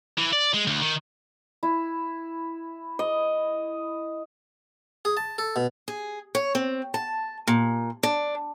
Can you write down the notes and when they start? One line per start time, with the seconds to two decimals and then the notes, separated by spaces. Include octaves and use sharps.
0.18 E3
0.33 D5
0.54 G#3
0.67 D2
0.82 D#3
1.63 E4
2.99 D#5
5.05 G#4
5.17 A5
5.38 A4
5.56 B2
5.88 G#4
6.35 C#5
6.55 C4
6.94 A5
7.47 A#2
8.03 D4